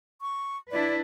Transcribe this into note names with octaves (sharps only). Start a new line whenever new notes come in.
C#6
D4 E4 B4 D5